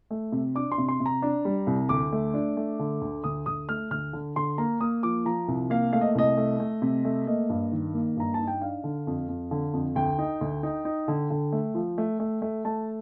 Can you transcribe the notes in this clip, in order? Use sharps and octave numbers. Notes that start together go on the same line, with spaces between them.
A3
C3
D4 D6
C6
C3
C6
C3
A#5
D4
G3
C2
D2 D6
A3
D4
A3
D3
D2
D2 D#6
D2 D#6
A3 F6
D2 F6
D3
D3 C6
A#3 A#5
A#3 D#6
F3 D6
F3 A#5
C2
A#3 F5
A3 F5
D#5
C2 D#5
A3
A3
C3
A3
A#3 D#5
G2
D#3
A#3
G2 A#5
D#4 A5
G5
D4 F5
D3
F2
F2
D3
F2
D2 G5
D#4
D2
D#4
D#4
D3
D3
A3
F3
A3
A3
A3
A3 A5